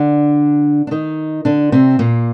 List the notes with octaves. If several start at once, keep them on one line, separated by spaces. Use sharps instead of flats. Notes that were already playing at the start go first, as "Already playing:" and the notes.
Already playing: D3 D4
D4
D#3 D#4
D3 D4
C3 C4
A#2 A#3